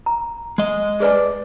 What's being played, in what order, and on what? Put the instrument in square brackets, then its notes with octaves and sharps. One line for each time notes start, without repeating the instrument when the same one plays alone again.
[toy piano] A#5
[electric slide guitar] G#3 D#5
[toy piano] G#4 B4 G#5 [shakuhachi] D5